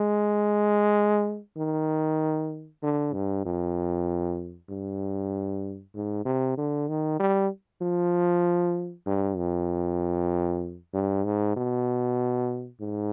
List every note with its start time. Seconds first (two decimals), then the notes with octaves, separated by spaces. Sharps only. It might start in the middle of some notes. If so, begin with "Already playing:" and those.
Already playing: G#3
1.57 D#3
2.83 D3
3.14 G2
3.45 F2
4.69 G2
5.95 G#2
6.25 C3
6.57 D3
6.88 D#3
7.20 G3
7.82 F3
9.06 G2
9.37 F2
10.94 G2
11.24 G#2
11.56 B2
12.81 G#2